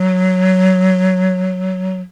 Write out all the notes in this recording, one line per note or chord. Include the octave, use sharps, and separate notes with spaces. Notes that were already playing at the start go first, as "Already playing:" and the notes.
Already playing: F#3